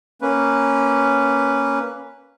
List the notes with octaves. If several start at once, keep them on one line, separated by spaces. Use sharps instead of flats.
A#3 C#4 B4